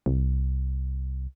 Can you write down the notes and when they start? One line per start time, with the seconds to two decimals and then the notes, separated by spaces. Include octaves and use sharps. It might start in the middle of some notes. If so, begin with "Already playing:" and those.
0.06 C2